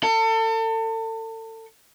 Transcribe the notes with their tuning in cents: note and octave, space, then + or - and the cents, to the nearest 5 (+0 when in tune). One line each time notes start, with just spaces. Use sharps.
A4 +35